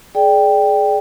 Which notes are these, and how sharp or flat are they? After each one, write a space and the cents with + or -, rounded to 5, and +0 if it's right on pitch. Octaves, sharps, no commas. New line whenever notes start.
G#4 +25 D5 +5 G5 +5